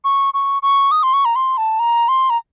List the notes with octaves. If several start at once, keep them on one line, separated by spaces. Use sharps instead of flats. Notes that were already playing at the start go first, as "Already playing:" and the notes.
C#6
C#6
C#6
D#6
C6
C#6
A#5
C6
A5
A#5
C6
A#5